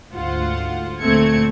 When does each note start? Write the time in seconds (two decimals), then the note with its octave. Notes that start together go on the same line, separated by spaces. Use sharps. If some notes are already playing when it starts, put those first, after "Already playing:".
0.13 D2 G#2 F4 C5 F#5
1.01 D2 A#2 A3 C4 G#6 C#7